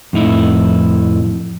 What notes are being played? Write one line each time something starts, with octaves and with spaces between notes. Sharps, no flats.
F2 A2 D#4 E4